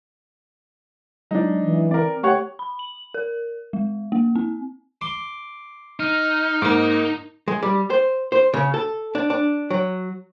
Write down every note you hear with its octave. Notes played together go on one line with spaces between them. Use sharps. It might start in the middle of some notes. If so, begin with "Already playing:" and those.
F#3 G#3 D4 D#4
E3
C4 A#4 D5
A3 G4 C#5 F#5 G5 C#6
B5
F#7
A#4
G#3
A#3
C4
C6 D6
D#4 F6
G#2 A#3 D6
G#3
G3
C5
C5
C#3
A4
D4
D4
F#3